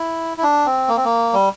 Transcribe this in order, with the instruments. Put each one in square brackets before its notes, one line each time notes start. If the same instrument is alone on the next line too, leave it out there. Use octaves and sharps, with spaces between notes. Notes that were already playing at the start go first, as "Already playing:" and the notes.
Already playing: [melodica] E4
E4
D4
C4
A#3
C4
A#3
G3